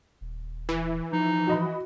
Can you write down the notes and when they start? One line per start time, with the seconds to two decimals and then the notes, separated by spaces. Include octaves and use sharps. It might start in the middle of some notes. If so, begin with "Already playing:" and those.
0.21 D#1
0.69 E3
1.13 F3 D#4
1.47 F#4 D#5 B5